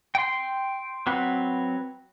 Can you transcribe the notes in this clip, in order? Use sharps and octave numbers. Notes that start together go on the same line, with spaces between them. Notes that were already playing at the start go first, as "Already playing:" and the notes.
G5 C6
F#3 C4 B4 F#5